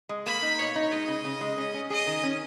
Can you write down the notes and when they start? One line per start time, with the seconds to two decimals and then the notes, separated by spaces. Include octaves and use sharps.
0.09 G#3
0.26 A#3 B5
0.42 D#4
0.59 B2 C#5
0.76 D#4
0.91 G#3 D#5
1.08 C#3
1.25 C#3
1.41 G#3
1.58 C#4
1.74 C#4
1.90 G#4 D#5
2.07 D#3
2.23 C#4